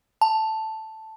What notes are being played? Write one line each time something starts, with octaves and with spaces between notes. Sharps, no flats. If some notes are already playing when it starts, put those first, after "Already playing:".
A5